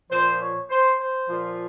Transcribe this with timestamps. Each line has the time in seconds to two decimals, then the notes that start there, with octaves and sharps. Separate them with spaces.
0.11 A#2 F3 C5
0.41 C#5
0.70 C5
1.00 C5
1.29 A#2 F3